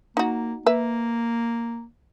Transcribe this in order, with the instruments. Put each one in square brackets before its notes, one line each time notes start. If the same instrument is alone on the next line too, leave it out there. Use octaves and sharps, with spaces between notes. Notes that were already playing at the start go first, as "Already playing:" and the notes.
[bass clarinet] A#3 [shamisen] D#4 F#4
[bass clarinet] A#3 [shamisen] B4 E5